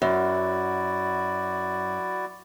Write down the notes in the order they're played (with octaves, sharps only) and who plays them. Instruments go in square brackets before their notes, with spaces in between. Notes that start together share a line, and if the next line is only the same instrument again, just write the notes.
[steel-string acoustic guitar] F#2 [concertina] E4 F#4 D5